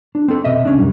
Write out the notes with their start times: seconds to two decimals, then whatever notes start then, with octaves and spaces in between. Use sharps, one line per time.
0.15 D4
0.28 C4 A4
0.44 B2 D#5 E5
0.65 C#2 C#4 D4
0.79 C2 F#2 G3